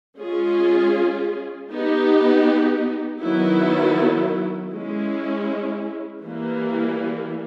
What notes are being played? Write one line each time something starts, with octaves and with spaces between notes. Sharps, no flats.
G#3 C#4 F4 G#4
B3 D#4 G4
D#3 F#3 B3 E4
G#3 C#4 E4
E3 G3 A#3